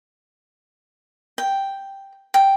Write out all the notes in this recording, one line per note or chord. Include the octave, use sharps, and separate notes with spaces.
G5
G5